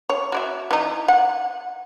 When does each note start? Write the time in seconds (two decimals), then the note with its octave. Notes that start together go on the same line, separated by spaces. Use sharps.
0.10 C#5
0.32 F#4 D5 E5
0.71 E3 D#4
1.08 F#5